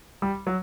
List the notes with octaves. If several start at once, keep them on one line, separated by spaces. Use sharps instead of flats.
G3
F#3